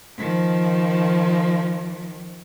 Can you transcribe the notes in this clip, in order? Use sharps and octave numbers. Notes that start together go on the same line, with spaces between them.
D#3 F3